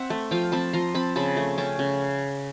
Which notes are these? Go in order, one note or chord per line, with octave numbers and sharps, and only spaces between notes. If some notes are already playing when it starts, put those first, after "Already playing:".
Already playing: C4 E5 F#5
A3
F3 F5 G5
C4 A5 B5
F3 A#5 C6
C4 A5 B5
C#3 A5 B5
A3
C#4 G5 A5
C#3